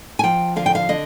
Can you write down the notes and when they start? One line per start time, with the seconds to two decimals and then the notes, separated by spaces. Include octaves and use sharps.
0.19 G#5
0.24 F3 G5
0.56 D3 F5
0.66 G5
0.75 F5
0.89 D3 D#5